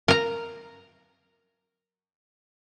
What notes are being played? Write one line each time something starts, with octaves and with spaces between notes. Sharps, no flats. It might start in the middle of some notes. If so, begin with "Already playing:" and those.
A#4 A#5